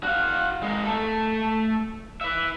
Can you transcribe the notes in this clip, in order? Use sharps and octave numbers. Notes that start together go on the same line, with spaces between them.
F#4 F5
G#3 A#4
A3 A4
B4 E5